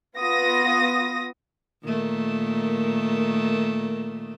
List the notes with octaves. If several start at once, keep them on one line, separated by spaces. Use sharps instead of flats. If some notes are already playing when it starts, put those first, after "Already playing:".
B3 F4 D#6 A#6
A#2 D#3 A3